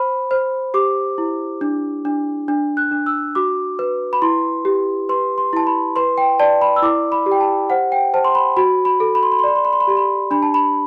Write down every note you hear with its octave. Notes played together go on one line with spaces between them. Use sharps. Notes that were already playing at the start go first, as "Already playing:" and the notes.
Already playing: C5 B5
C5
G4 D6
E4
D4
D4
D4
F#6
D4
E6
F#4 D6
B4
B5
E4 C6
G4
B4 C6
C6
E4 A5
B5
B4 C6
G5
D5 A5
B5
E6
E4 D6
B5
G4
G5
A5
C5 F#5
G5
C5 A5
C6
B5
F#4 B5
B5
A4
B5
C6
B5
C6
D5 B5
C6
B5
C6
B5
G4 C6
B5
D4 B5
A5
B5